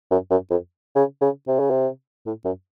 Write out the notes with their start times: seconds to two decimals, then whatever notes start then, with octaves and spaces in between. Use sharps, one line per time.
0.11 F#2
0.30 F#2
0.50 F2
0.96 C#3
1.21 C#3
1.47 C3
1.59 C#3
1.70 C3
2.26 A2
2.45 F#2